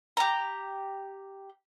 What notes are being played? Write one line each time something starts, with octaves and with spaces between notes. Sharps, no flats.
G4 A#5